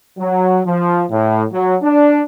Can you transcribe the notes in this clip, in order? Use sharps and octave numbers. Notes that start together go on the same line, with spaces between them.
F#3
F3
A2
F#3
D4